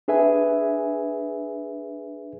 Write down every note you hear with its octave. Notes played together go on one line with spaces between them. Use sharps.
D4 G#4 B4 E5 G#5